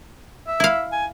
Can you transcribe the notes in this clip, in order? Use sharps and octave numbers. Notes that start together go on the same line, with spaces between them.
E5
E4 F5
G#5